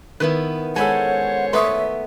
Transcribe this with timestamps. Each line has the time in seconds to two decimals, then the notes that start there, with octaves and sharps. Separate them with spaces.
0.20 D#3 B3 E4 B4
0.76 G#3 C#4 A4 C5 C#5 F#5 G#5 B5
1.53 A3 B3 B4 E5 C6 C#6 D#6